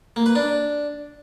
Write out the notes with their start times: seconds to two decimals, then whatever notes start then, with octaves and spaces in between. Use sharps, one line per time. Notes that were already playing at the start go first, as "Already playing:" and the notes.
0.16 A#3
0.26 B4
0.35 D4